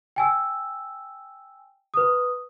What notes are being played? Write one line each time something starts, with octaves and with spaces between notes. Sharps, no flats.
G5 G#5 E6
B4 D#6